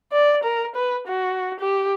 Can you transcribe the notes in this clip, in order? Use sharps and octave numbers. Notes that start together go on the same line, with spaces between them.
D5
A#4
B4
F#4
G4